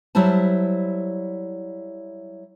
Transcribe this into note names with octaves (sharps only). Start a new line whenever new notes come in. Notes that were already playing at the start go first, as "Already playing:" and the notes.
F#3 G3 E4 C5 A5